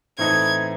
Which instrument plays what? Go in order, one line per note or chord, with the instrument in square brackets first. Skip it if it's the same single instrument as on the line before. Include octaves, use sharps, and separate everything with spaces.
[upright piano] A2 E3 C4 D#4 A4 [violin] G#6